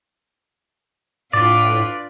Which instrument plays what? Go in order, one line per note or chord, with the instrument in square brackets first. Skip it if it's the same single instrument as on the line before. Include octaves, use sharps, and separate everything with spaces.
[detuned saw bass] A2 [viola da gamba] D4 F4 B4 [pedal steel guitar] D5